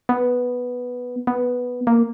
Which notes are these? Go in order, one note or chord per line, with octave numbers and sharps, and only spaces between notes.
B3
B3
A#3